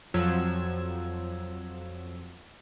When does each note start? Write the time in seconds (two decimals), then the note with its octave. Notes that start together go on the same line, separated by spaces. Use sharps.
0.14 F2 F3 F#3 E6 G#6